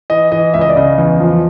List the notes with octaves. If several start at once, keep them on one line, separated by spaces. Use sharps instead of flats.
E3 D#5
E3 D#5
C#2 E5
D#5
D5
C#3 D#5
E2
F3